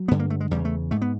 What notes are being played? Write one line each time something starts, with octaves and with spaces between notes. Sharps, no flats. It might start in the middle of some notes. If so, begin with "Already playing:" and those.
Already playing: F#3
G2 D3 B3
A#3
A3
G#3
E2 C#3 G3
A3
G#2 A3
B3